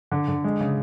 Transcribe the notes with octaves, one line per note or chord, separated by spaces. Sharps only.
D3
D3
G#3
C#3